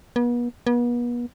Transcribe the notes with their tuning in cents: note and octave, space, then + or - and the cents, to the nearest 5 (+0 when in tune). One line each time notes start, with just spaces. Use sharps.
B3 -40
B3 -40